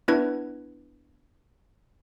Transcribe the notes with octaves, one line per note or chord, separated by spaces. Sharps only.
B3 D4 E4 B4 G#6